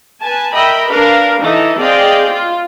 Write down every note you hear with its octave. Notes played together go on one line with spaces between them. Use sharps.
B4 G#5 A5
A#4 D#5 E5 G5 B5
D4 A#4 B4 F5
E3 D#4 A4
C4 G#4 D5 D#5 F5 G5
F4